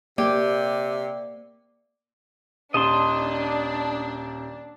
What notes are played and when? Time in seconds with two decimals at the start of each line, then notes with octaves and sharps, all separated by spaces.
0.18 C3 A#3 G4 D5
2.74 D#1 D4 D#5 A5 C6